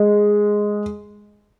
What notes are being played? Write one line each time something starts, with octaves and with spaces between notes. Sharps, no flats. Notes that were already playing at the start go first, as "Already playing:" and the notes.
Already playing: G#3